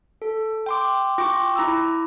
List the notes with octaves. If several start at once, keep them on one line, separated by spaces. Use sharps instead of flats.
A4
G5 C6 D6
F4 G5 C#6 D6
E4 A#5 D6 E6